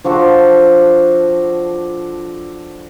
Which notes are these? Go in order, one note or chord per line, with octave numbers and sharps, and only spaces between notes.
F3 D4 F#4 A4